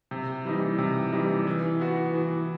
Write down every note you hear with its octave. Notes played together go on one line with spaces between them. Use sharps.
C3
E3 G3 D#4
C3
E3 G3 D#4
E3
B3 F#4
E3